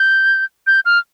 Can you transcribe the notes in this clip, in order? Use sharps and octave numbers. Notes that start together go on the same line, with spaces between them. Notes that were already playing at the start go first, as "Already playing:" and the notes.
Already playing: G6
G6
F6